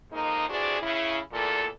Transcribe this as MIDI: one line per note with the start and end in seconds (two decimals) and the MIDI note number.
0.11 0.47 41
0.11 0.47 56
0.11 0.47 58
0.11 0.47 63
0.48 0.77 48
0.48 0.77 52
0.48 0.77 62
0.48 0.77 66
0.48 0.77 68
0.48 0.77 74
0.82 1.18 49
0.82 1.18 64
1.32 1.66 40
1.32 1.66 46
1.32 1.66 69